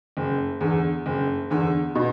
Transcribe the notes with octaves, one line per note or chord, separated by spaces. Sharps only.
F#1
E2 D3
F#1
E2 D3
B2